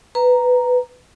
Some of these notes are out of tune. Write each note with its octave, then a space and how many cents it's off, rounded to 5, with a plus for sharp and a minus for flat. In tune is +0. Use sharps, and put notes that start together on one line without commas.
B4 +10 A#5 +0